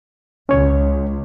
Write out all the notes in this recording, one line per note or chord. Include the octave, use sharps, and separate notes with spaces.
C#2 C#4 C#5